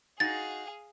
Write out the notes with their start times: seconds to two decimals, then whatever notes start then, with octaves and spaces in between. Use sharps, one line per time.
0.20 D#4 F#4 G#4 F5 A6